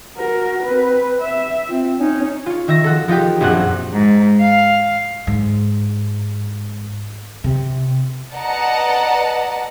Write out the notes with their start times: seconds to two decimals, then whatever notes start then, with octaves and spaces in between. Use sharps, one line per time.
0.17 F#4 A#4
0.63 C4 B4
1.21 E5
1.68 C4 F4
1.99 C#4 D#4
2.46 F4 C#5
2.67 D#3 E5 A#6
2.84 F3 F#4 A4
3.08 F3 D#4 F4 G4
3.41 A#1 F#2 C4 F#5
3.92 G#2
4.41 F5
5.27 G#2
7.44 C3
8.34 B4 D5 D#5 F#5 A5 A#5